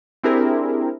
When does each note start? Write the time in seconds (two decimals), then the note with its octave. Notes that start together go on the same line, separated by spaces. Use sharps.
0.24 C4 D4 E4 G4 G#4 A#4